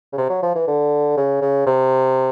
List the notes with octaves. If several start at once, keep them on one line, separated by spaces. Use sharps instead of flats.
C#3
C3
F#3
F3
E3
D3
C#3
C#3
C3